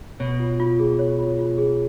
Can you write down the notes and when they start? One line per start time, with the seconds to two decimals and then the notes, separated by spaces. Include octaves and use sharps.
0.20 B2 C#5
0.40 F4
0.60 F4
0.80 G#4
0.99 C#5
1.18 F4
1.39 F4
1.58 G#4